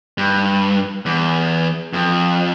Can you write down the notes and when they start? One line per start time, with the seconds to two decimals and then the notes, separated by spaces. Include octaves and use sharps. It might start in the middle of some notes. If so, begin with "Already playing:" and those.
0.18 G2
1.06 E2
1.93 F2